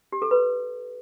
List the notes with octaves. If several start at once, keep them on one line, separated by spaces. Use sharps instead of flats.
G4
A4
B4